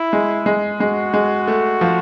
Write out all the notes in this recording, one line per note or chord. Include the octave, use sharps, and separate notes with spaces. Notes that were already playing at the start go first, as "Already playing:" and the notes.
Already playing: E4
G#3
G#3
G#3 F#4
G#3
A3
F3